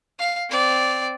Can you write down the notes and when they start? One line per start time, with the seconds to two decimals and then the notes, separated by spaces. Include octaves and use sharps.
0.19 F5
0.50 C4 D5